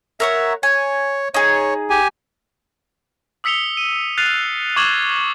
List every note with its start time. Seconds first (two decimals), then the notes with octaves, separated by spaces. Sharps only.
0.20 A#4 C#5 E5 F#5
0.63 C#5 G#5
1.34 D#4 G#4 C#5
1.90 G4 G#5
3.44 D#6 E6 B6 C#7 F7 G7
3.77 D#7
4.18 F6 F#6 A6 C7 D#7 F7
4.76 C#6 D6 G#6 F#7 G7